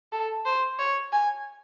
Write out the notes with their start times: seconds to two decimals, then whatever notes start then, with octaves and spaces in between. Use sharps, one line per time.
0.12 A4
0.45 C5
0.79 C#5
1.12 G#5